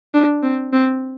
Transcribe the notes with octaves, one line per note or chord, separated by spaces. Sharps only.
D4
C4
C4